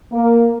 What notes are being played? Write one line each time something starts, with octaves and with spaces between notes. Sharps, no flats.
A#3